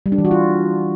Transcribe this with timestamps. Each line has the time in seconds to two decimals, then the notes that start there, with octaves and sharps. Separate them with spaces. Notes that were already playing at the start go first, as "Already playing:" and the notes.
0.06 G3
0.12 D4
0.18 E3
0.25 F#4
0.31 F4